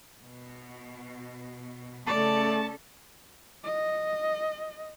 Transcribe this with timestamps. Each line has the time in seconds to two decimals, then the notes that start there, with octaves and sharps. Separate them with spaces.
0.19 B2
2.06 C#3 A3 C#4 A4 D5 A5
3.64 D#5